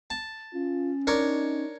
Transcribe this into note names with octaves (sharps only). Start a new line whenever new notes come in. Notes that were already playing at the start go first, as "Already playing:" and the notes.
A5
C#4 F4
D4 D#4 A#4 C#5